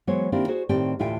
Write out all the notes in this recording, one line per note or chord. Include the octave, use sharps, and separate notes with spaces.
E3 F#3 G#3 B3 C5 C#5
D#3 A#3 C4 D4 E4 G4
F#4 G#4 C5
A2 D#3 C4 G4 D5 G5
D2 A2 E3 F4 E5 G5